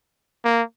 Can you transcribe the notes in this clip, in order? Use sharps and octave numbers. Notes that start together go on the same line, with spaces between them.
A#3